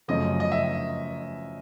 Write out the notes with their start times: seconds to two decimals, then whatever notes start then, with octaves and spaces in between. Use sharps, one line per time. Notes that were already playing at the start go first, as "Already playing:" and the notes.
0.08 F#2 C#3 F3 A3 D#5
0.40 D#5
0.52 E5